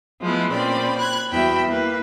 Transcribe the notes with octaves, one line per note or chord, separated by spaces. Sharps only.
F3 G#3 A3 B3 E4
A#2 C4 C#4 D5 B5
B5 F#6 G#6
E2 G3 F#4 E5 G5 B5
A#3 E4 B4